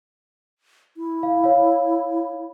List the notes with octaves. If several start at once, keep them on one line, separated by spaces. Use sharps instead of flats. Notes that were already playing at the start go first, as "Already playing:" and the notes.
E4
F5
C#5 F5